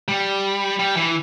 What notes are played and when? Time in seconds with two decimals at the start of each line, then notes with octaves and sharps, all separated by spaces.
0.08 G3
0.79 G3
0.97 E3